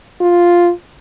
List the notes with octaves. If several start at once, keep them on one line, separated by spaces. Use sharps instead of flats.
F4